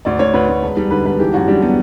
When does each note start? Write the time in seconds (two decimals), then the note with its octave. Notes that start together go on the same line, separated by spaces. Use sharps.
0.05 D2 D5
0.19 D2 C#5
0.34 D2 B4
0.49 D2
0.62 E1
0.77 G3
0.91 D3 B4
1.06 E1 B4
1.19 E3 G4
1.34 F#2 F#4
1.48 G3 D4
1.62 G3 B3